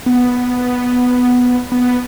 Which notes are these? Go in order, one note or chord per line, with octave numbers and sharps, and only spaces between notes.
B3
B3